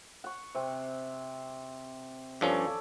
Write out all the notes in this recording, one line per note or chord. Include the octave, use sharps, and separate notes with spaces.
F#5 C#6
C3 C4
G2 F3 C#4 A4 C#5 D5